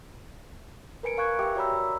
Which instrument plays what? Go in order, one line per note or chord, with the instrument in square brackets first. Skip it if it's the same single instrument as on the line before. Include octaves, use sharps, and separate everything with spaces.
[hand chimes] A#4 B4 G#5 C#7 D7
A#4 F5 C#6 F#6 G#6
G4 E5 G5 D6
F#4 C#5 D5 A#5 B5 E6